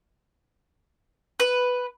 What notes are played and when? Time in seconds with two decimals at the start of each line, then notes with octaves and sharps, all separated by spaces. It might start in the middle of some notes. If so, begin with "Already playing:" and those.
1.40 B4